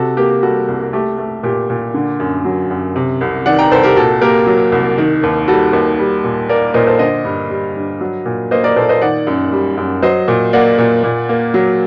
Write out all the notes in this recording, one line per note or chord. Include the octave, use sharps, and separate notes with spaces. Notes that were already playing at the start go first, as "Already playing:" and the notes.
Already playing: C3 F#4 A4
A#3 G4
G4
G3 F#4 A4
C2
A3 G4
A3
A#2 G4
A#2
D3
F#2
F#3
F#2
C3
C2
D#3 D5 F#5
G5 A#5
C2 A4 C5
G4 A#4
A#2 F#4 A4
A#3 G4 A#4
F#3
C2
D#3
D#2
G3 F#4 A4
D#2
G3
A#2
A#3 A#4 D5
A#2 C5 D#5
A4 C5
D3 C5 D#5
G2
G3
G2
F#3
A#2
A#3 C5 D#5
A#4 D5
A#2 A4 C5
C5 D#5
D#3 D5 F#5
F#2
G3
F#2
F#3 C5 D#5
A#2
A#3 D5 F#5
A#2
A#2
A#3
F#3